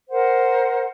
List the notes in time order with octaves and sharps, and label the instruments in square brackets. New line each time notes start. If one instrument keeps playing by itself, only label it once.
[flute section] A#4 C5 F#5